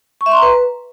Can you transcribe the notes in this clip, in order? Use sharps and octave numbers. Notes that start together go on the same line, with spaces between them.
C#6
E5
C6
A#5
B4